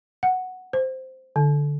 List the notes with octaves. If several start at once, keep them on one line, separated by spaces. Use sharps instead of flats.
F#5
C5
D3